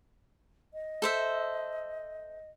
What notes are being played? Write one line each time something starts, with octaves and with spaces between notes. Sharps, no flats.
D#5
A4 C5 E5